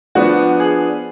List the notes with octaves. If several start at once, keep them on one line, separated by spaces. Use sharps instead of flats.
F3 B3 D4 F#4
G#4